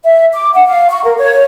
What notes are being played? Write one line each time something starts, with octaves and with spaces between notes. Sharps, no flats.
E5
D6
F#5
F5
C#6
A#4
C#5